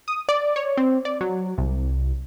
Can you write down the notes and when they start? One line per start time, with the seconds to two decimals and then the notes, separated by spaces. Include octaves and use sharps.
0.08 D#6
0.29 D5
0.56 C#5
0.77 C4
1.05 D5
1.21 F#3
1.58 C2